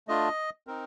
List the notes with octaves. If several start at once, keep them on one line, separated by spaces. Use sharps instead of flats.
A3 D4 F4 D#5
C4 D#4 A#4